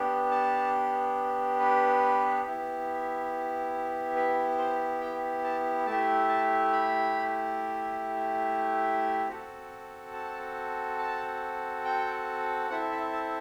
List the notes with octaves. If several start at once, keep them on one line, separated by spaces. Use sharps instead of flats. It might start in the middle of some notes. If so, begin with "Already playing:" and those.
Already playing: B3 D4 G4
A5
B4
B3 E4 G4
B4
C5
G5
A5
A3 E4 G4 A5
A5
B5
C4 F#4 A4
A5
A5
G5
C4 E4 A4 F#5
E5
A5